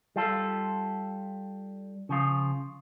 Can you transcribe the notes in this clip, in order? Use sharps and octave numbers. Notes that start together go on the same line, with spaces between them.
G3 F4 A4
C#3 F3 F4